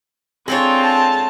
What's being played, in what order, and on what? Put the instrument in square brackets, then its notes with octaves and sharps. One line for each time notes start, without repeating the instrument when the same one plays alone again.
[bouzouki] G#3 A4 C#5 [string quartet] C4 D4 F4 [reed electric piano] G#4
[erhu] A5